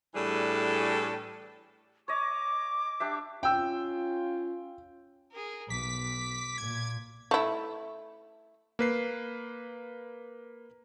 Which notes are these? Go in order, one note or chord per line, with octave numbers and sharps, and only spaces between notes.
A2 E3 G3 D4 G#4 A4
C#5 D#5 D6
D4 G4 E5
C#4 F4 G5 E6
G#4 A#4
B1 D6 B6
A#2 G#6
A3 E4
A#3 B4 C7